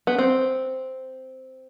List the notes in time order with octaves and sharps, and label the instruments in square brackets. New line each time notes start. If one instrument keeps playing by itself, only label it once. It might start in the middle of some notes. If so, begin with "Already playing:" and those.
[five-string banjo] B3
C4